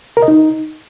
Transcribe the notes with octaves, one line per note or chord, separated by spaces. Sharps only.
A#4
D#5
D#4